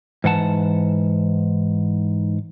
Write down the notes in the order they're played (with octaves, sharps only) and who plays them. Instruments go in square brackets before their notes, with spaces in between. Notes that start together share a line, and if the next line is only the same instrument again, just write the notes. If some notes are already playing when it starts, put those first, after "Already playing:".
[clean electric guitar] G#2 E3 F#5 A5